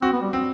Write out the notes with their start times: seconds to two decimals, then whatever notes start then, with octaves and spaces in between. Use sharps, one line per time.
0.02 C4 F#4
0.13 B3
0.22 G3
0.33 C4